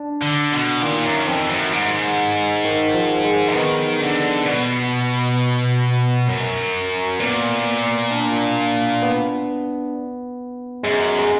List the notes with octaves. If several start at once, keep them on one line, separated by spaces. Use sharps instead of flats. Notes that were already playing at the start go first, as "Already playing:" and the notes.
Already playing: D4
D3
B2
A#2 D#3
F#2
F2
F#2
G#2
D#3
F3
G#3
D#3 B3
D3
B2
F#2
A#2 B3
D4
B3
F#2 G#3
G#3